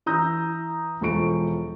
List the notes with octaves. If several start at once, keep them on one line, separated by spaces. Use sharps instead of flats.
E3 A#5 D#6 E6 G6 A#6
E1 F3 A4 C#6 D7